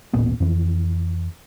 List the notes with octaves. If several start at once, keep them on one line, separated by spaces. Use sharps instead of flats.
D#1 A1 A#2 B3
F2 E3